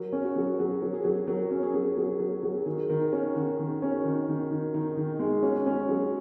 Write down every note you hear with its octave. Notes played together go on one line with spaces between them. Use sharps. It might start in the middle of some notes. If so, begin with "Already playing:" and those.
Already playing: F#3 A#4
C#4
F#4
F#3
F#3 F#4
F#3
G#4
F#3
F#3 A#4
C#4
G#4
F#3
F#3
F#3
F#3
D#3 G#4
D#3 A#4
C#4 F#4
D#3 F#4
D#3
C#4
D#3
D#3
D#3
D#3 D#4
D#3
D#4
G#3
C#4 F#4
C#4
F#4
F#3